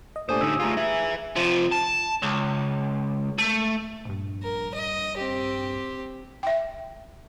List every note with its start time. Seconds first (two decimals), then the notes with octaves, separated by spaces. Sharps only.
0.16 D#5
0.29 A#2 A3 D4 G4 C5 G#5 D#6
0.41 A2 D3 D#4 E6
0.60 A3 F4 G#4 G#5 A#5
0.77 B4 E5
1.36 C3 F3
1.71 A5
2.22 C#2
3.39 A3
4.05 A#1 G2
4.43 A#4
4.74 D#5
5.17 C4 G4
6.43 E5 G5